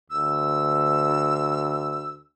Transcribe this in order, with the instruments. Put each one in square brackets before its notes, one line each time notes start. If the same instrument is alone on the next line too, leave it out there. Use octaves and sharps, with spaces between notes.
[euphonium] D2 [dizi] E6